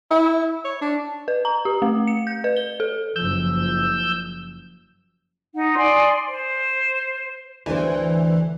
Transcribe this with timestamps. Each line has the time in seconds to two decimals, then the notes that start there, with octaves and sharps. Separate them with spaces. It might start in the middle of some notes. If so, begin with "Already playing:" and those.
0.11 E4
0.65 C#5
0.82 D4
1.28 B4
1.45 A#5
1.65 G4
1.82 A3
2.07 C#7
2.27 G6
2.44 B4
2.57 G7
2.80 A4
3.16 F#1 F3 E6 G6
5.54 D#4 F#5
5.75 D5 G#5 C6 D#6
6.27 C5
7.66 D2 E3 C5